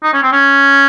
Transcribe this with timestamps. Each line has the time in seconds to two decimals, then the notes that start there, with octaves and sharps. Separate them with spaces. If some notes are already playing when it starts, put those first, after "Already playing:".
0.03 D#4
0.13 C#4
0.23 C4
0.32 C#4